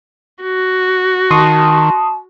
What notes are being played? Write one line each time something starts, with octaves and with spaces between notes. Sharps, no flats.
F#4
D#3 A5 C6 C#6 D#6